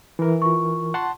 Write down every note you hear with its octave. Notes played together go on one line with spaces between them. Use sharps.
E3 A#4
F4 C#6
F#5 A5 C6